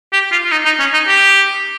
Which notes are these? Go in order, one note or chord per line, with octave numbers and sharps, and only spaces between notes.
G4
F4
F4
D#4
D#4
C#4
D#4
G4